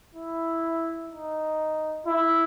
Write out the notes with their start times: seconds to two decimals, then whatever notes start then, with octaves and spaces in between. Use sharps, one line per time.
0.15 E4
1.11 D#4
2.06 E4